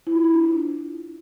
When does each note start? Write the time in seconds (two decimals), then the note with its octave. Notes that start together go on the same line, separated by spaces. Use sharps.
0.07 E4
0.15 F4
0.24 E4
0.34 D4